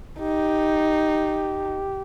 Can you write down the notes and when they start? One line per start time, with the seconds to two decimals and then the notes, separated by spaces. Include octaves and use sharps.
0.19 D#4 G4